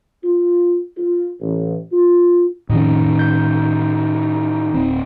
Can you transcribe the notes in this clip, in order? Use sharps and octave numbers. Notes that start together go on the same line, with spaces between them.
F4
F4
A1
F4
F2 A2 D#3 C#4 D#4
G6
D1 C4